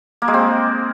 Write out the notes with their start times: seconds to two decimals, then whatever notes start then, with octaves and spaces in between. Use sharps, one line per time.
0.22 A#3
0.28 G#3
0.34 C4